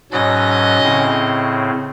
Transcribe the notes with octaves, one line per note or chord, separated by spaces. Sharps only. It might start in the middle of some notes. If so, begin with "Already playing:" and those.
G#2 B2 F#3 C#4 D#5
A2 C#3 C4